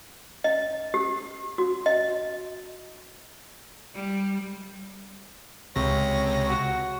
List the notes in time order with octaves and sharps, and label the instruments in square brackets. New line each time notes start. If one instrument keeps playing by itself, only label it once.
[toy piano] D#5
G4
F#4
D#5
[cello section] G3
[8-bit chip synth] C#2 C3 A#6 [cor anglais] C#5
[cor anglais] F#4